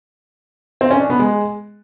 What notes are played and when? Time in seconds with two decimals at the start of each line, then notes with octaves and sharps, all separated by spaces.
0.81 C4
0.90 C#4
1.00 D4
1.10 B3
1.19 G#3